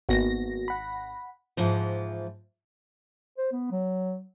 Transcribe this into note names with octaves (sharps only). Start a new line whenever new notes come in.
G#1 A#3 B3 F#4 A#6
F#5 B5
G#2 E3 F3
C5
B3
F#3